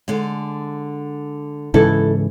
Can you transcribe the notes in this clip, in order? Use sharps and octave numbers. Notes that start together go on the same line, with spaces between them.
D3 G#3
G#2 C#3 E3 E4 A4